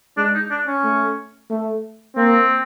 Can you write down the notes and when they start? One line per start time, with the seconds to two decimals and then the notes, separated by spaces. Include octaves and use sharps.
0.17 G#3 D4
0.34 D#4
0.51 D4
0.67 C#4
0.84 A3
1.50 A3
2.16 A#3 C4